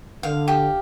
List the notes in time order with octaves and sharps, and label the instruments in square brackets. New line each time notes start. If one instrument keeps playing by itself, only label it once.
[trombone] D3 [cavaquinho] F5
[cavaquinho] G4